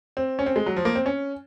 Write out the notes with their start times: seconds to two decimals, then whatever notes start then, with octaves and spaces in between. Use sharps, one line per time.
0.17 C4
0.39 C#4
0.46 C4
0.56 G#3
0.66 F#3
0.76 F3
0.85 A#3
0.95 C4
1.06 C#4